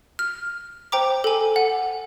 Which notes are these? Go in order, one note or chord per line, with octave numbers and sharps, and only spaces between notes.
F6
C5 G5 A#5 D6
A4 G#5
F#5